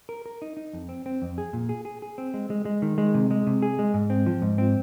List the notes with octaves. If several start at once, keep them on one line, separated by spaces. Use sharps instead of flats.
A#4
A#4
D#4
D#4
F2
C4
C4
F2
G#4
A#2
G#4
G#4
G#4
C4
G#3
G#3
G#3
D#3
G#3
C3
G#3
C3
G#4
G#3
G#2
C4
F3
G#2
C4